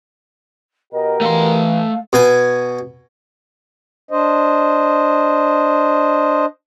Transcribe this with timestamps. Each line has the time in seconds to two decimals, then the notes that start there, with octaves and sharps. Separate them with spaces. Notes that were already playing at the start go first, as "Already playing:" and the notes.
0.93 B2 G4 A#4 D#5
1.21 E3 A3 F5 C6
2.13 B2 G#5
4.11 D4 C5 D#5